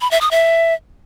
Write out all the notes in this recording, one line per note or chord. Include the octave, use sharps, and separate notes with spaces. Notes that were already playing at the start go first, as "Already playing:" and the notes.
B5
E5
D#6
E5